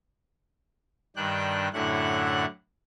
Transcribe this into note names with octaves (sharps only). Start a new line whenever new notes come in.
G2 D#3 D4 G5 F#6
F#2 A2 D3 E4 F#5 F#6